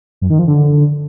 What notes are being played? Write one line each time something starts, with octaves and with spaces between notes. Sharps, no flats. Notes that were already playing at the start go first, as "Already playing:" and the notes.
F#2
D#3
F3
D3